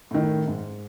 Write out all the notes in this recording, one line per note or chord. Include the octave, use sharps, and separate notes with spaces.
A2 D#3
G#2